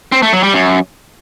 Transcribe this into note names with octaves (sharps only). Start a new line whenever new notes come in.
C4
A3
F#3
G3
F#2